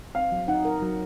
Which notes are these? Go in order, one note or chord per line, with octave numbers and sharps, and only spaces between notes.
C4 F5
F#3
D#4 F#5
A#4
F#3